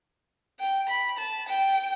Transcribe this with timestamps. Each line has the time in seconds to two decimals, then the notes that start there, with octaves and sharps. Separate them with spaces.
0.60 G5
0.89 B5
1.19 A5
1.48 G5